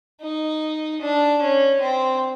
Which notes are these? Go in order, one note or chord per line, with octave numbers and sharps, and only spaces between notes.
D#4
D4
C#4
C4